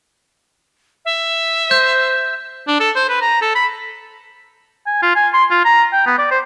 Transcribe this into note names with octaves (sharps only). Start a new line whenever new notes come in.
E5
C5 G6
D4
A4
C5
B4
A#5
A4
B5
G#5
F4
G#5
C6
F4
A#5
G5
B3
D5
C5